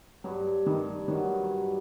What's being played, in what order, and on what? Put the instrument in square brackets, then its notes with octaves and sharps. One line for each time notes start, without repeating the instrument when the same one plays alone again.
[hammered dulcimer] G2 [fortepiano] F#3
[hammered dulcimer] G2 [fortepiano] D#3
[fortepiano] D#3 [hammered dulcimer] F#3
[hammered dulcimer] G2